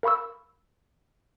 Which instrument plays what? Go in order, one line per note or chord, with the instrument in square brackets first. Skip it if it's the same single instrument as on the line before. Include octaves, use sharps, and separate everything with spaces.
[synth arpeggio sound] A#4 F5 B5 C#6 E6